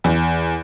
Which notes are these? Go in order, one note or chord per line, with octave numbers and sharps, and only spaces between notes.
E2